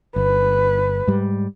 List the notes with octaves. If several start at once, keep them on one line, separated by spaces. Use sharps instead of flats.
G1 B4
G#2 G3